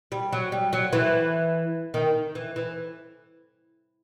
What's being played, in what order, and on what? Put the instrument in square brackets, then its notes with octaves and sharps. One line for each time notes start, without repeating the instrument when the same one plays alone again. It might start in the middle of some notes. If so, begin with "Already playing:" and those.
[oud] G3
F#3
G3
F#3
E3
D#3
E3
E3